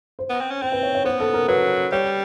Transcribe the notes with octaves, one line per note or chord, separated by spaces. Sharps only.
C5
B3
C4
C#4
C4 C5
B4
C#5
C#5
B3 C5
A4
A#4
F#3 B4
G3 C#5